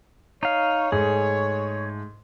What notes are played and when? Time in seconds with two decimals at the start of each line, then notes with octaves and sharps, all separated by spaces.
0.43 D#4 C#5 F5
0.92 G#2 A3 G#4